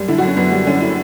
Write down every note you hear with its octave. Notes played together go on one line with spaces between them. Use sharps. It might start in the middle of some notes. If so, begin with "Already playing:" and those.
Already playing: F#2 G3
D3 E4
F#4
F#2
C#4
F#2 B3
G3
D3 C#4
E4